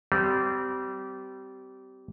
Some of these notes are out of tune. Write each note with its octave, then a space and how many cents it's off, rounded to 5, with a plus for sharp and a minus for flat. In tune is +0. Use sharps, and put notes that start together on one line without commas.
G3 -25 C4 -25